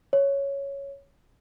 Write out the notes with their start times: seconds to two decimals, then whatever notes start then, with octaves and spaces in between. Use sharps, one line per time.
0.13 C#5